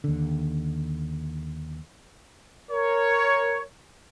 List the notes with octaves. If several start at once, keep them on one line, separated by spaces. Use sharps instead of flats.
D#2 D3
A#4 C#5